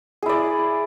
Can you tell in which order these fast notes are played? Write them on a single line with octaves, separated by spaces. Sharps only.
G#4 E4 D5